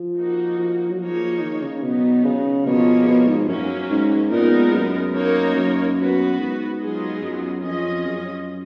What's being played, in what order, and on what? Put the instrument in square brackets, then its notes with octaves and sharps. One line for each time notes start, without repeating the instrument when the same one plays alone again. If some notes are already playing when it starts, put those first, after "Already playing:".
Already playing: [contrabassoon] F3
[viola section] A#3 D#4 F#4
[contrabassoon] F3
F#3
[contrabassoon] F3 [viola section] A#3 D#4 G#4 C#5
[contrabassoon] D#3
C#3
[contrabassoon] B2 [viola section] F#3 B3 D#4
[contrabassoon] C#3
[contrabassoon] B2 [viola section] F3 A#3 F4 G#4 C#5
[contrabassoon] B2
G#2
[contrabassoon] F#2 [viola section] F#3 A#3 C#4
[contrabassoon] G#2
[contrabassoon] A#2 [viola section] G#3 B3 D#4 A#4
[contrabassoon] F#2
[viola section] A#3 D#4 A#4 C#5
[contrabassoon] F#2
[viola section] B3 F#4 B4
[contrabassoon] G#2
[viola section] F#3 B3 F4 G#4 D#5
[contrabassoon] F#2
[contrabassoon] F2 [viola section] C#4 F4 G#4 D#5
[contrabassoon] F#2